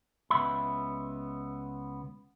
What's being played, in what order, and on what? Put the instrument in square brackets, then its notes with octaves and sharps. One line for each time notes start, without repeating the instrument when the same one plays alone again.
[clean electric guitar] C#2 G2 B3 E5 B5